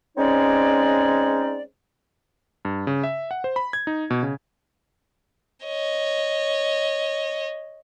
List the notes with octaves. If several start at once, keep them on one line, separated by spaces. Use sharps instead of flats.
G#3 C4 C#4 D#4 C#5 D5
G2
C#3
E5
F#5
C5
B5
G#6
D#4
B2
C#3
C#5 D#5